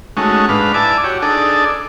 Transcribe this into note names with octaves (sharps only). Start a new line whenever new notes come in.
G#3 A3 C#4 D#4 F#4
G#2 D4 B4 F5
E4 D5 G#5 A5 D6
F#4 G4 C#5
D4 D#4 G#4 A4 D5